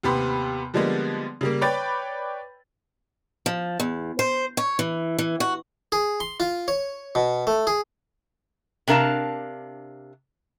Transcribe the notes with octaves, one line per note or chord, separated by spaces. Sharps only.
D#2 C3 B3 B5 C6
D3 F3 G3 G#3 A#3 B3
C#3 G3 A#3
B4 C#5 D5 G5 B5 A6
F3
E2
C5
C#5
E3
E3
F#4
G#4
C6
F4
C#5
B2
A3
G#4
C3 D4 A#4 F5 A5